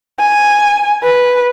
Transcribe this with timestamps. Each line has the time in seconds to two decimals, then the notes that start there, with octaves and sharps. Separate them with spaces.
0.20 G#5
1.03 B4